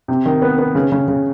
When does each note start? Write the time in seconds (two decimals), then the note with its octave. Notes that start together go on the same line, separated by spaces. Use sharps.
0.08 C3
0.26 D#3
0.42 B3
0.58 B3
0.75 C#3
0.92 C#3
1.08 C#3